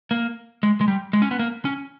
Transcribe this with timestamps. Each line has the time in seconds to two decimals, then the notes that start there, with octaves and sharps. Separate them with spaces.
0.11 A#3
0.63 G#3
0.81 G#3
0.88 G3
1.13 G#3
1.22 C#4
1.31 B3
1.39 A#3
1.65 C#4